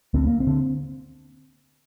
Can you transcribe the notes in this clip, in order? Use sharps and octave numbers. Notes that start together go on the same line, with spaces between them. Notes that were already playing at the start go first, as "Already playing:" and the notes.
D2 C4
A#3
C4
D3